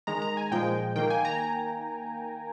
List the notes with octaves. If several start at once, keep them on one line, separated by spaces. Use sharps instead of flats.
D#3 G#3 A#5
A#5
G#5
A#2 F3 G#3 G5
D#3 A#3 G5
G#5
A#5